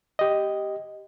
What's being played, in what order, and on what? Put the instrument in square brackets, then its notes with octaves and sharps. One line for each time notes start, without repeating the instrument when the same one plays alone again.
[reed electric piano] G4 D#5